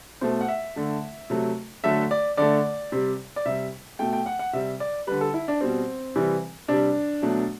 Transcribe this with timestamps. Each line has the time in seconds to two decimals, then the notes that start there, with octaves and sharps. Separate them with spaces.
0.21 B2 A3 C5
0.41 F#5
0.48 E5
0.76 D3 A3
1.30 C3 F#3 A3
1.84 D3 F#3 A3 E5
2.11 D5
2.37 D3 A3 D5
2.92 C3 G3
3.36 D5
3.46 C3 G3 E5
3.99 B2 A3 G5
4.13 G5
4.26 F#5
4.39 F#5
4.53 C3 G3 E5
4.80 D5
5.07 D3 G3 B4
5.21 A4
5.34 E4
5.48 D4
5.61 B2 G3 C4
6.16 C3 E3 G3
6.68 C3 G3 D4
7.22 B2 F#3 A3